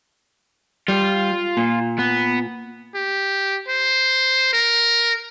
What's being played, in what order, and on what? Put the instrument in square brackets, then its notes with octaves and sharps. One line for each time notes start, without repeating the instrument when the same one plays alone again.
[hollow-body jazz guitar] G3 [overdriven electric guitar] F4
[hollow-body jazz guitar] A#2
[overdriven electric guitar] B3
[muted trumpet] G4
C5
A#4